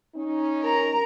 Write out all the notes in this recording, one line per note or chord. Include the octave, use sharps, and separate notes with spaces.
C#4 D#4
A#4 A#5